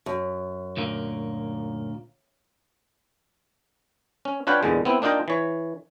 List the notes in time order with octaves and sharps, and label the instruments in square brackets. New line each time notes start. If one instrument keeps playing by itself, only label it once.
[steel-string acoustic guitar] F#2
[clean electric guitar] D2 A#2 A#3
[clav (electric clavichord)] C#4
D4 F4 B4 C#5 F#5 G5
E2 A#2 D3 G#3
B3 C4 E4
A#3 D4 D#4 F4 G5 A#5
E3 C#5